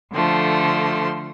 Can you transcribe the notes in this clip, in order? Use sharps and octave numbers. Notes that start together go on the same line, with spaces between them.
D3 F3 A3 C6